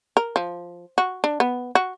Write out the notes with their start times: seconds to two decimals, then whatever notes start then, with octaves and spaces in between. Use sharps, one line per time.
0.17 A#4
0.36 F3
0.98 F#4
1.24 D4
1.40 B3
1.75 F#4